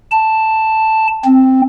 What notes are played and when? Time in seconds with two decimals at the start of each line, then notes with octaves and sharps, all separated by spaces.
0.12 A5
1.25 C4